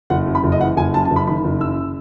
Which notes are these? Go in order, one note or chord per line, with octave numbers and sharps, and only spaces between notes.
F#1 F#5
F#2
B5
F#1
D#5
E3 F#5
F#1 G#5
F#2 A5
A5
F#1
B5
D#3 B5
F#1
F#2 E6